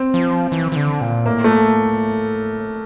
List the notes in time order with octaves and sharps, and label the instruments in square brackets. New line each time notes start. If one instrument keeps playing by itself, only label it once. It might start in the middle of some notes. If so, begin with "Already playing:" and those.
Already playing: [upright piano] C4
[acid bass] F3
E3
E3
D3
A#2
[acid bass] A2 [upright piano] A#3
[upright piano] A3